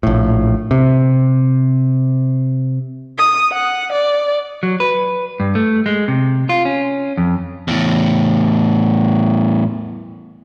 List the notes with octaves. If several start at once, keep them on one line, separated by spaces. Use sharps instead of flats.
A#1 A2
C3
D#6
F#5
D5
F#3
B4
G2
A3
G#3
C3
F4
C#4
F2
E2 A2